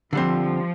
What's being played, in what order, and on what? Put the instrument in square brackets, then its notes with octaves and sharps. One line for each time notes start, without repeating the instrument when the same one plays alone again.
[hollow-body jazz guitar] D3 G3 C4 [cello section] F3